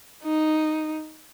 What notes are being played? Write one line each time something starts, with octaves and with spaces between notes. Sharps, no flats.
D#4